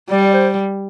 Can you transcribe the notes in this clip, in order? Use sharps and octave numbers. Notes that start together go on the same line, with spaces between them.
G3 D5
D5
C5